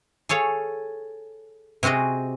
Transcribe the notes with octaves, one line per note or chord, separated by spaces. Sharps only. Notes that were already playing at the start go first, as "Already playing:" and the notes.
G#4 A4 C#5 F5
C3 C4 F#4 G#4 D#5